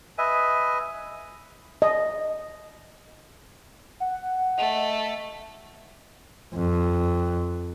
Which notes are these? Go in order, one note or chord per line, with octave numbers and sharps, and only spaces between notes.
B4 D#5 E5 G#5
D#5
F#5
A3 D#5
F2